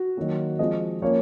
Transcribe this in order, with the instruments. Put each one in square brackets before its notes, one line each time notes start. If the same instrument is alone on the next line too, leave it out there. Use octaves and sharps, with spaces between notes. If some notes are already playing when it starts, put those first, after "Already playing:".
Already playing: [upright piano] F#4
D#3 F#3 A#3
F3 G#3 C4 D#5
F3 A#3 C#4 C#5